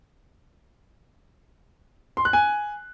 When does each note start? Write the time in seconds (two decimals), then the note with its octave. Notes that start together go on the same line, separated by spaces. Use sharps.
2.17 C6
2.25 F#6
2.33 G#5